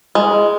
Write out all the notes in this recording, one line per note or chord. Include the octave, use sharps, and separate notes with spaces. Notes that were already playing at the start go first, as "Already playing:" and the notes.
G#3